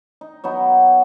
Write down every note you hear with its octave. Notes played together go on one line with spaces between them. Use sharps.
D#4
F#3 B3 D#4